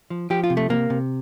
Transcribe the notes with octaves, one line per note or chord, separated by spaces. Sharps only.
F3
F3 G4
F4
C3
A3
C3 A#3
C3